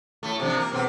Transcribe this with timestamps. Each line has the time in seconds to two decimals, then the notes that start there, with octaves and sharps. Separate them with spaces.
0.23 A2 A3
0.40 C3 F3 D4
0.57 A#3
0.72 G#2 B2 C4